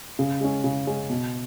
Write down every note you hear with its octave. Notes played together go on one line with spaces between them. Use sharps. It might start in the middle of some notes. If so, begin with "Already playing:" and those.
C#3
G#3 C#4
C#3
G#3 C#4
B2